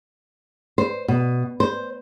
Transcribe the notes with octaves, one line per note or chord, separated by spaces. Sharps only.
C5
B2
C5